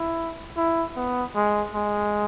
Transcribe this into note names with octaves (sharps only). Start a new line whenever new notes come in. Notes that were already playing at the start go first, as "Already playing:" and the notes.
Already playing: E4
E4
B3
G#3
G#3